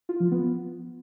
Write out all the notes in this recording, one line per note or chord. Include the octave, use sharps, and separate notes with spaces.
F4
F3
B3